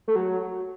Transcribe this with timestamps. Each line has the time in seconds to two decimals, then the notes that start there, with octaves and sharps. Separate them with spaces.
0.08 A3
0.16 F#3